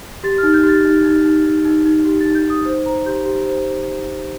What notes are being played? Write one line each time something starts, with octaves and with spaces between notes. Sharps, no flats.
G4 A6
F6
D#4
G6
G4
A6
D#4
D#4
D#4
D#4
D#4
D#4
G4
A6
D#4
G6
D#4 D#6
C5
C5 A#5
G4 G6
G4
C5